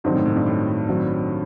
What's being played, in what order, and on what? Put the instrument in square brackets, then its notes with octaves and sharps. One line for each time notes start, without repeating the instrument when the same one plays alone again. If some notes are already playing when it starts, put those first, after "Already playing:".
[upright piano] G2 [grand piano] D#3 F#3 C4 D#4 F#4
[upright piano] A2
A2
G2
A2
[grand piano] D#3 F#3 C4